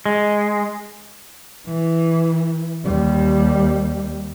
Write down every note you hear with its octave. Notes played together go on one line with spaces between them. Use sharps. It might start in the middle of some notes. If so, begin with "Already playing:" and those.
G#3
E3
D#2 G3